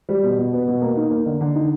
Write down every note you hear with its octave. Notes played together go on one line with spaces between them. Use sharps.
G3
B2
B2
B3
B2
A#3
D#4
A#3
D3
D3
D#4